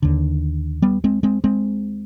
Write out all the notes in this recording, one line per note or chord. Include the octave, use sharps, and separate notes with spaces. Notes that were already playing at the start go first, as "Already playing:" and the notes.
D#2 D3
G3 B3
G#3 C4
G#3 C4
G#3 C4